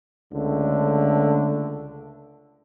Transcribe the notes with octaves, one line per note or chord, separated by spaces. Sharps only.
C#2 D3 A3